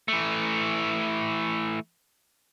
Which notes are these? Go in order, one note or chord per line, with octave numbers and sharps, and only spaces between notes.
E3 A3